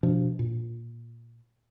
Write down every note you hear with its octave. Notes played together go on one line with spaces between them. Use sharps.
B2 F3 D4
A#2